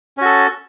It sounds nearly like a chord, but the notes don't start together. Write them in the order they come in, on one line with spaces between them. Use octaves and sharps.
C#4 F#4 A4